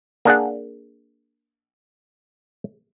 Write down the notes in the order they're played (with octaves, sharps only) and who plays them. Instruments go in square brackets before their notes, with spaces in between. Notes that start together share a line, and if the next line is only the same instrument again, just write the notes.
[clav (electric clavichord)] A#3 D4 G#4 F#5